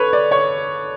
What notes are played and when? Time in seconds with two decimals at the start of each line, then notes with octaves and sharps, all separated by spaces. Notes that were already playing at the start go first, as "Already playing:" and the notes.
Already playing: A4 B4 C#5
0.13 D5
0.31 C#5